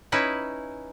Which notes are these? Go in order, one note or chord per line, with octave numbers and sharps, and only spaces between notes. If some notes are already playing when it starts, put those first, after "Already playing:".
C#4 D#4 E4 B4